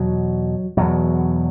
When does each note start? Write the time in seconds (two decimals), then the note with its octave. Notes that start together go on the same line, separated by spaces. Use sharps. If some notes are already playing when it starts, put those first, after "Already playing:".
Already playing: E2 B2 F#3
0.77 E2 B2 F#3